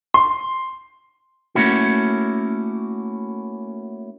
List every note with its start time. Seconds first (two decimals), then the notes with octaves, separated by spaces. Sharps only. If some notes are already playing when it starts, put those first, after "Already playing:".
0.14 C6
1.55 A3 A#3 C#4 E4 F#4